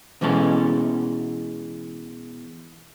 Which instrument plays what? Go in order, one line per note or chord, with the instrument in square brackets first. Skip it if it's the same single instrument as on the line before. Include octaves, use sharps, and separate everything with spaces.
[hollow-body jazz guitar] B2 E3 G#3 C#4 A4